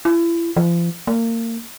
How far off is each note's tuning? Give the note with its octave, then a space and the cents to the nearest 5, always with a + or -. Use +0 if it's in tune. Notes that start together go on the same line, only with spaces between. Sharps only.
E4 +35
F3 -35
A#3 -30